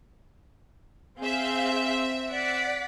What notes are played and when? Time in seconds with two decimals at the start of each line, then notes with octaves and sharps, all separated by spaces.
1.20 C4 G#4 E5 F5 G6
2.31 D5 F#5 B6